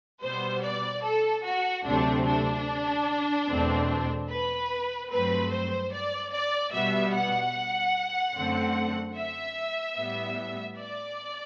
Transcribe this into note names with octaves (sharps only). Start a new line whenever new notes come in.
B2 G3 B3 C5
D5
A4
F#4
D2 C3 F#3 A3 C4 D4
D4
E2 B2 A3 C4
B4
G2 F#3 A3 C4 B4
C5
D5
D5
B2 G3 B3 E5
F#5
F#2 D3 A3 C4
E5
A2 G3 B3
D5